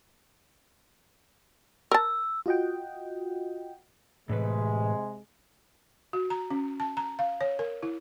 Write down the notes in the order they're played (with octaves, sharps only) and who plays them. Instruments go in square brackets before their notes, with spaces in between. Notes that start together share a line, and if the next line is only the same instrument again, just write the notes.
[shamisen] A#4 A5 [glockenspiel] E6
[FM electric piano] F4 F#4 D#5 F#5 G5
[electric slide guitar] A2 E3 B4 [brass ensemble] C3 G#3
[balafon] F#4
A#5
C#4
A5
A#5
F5
C#5
A#4
E4